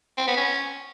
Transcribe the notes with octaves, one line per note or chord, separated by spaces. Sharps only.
C4
B3
C#4